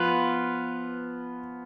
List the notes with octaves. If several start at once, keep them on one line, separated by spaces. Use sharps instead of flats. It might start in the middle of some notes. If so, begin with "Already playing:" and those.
Already playing: F3 B3 F4 B4